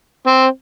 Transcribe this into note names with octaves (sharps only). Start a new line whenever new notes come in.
C4